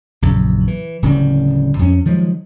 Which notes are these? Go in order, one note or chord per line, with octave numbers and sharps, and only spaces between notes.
A#1 F#2 C#3
E3
D1 C#3 E3 G3
F2 C#4
D#3 F3 F#3 G#3